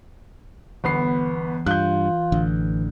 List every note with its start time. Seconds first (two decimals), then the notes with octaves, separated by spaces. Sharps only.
0.84 G1 E3 B3 C7
1.66 G2 F4 F#6 G6
2.32 A1 D3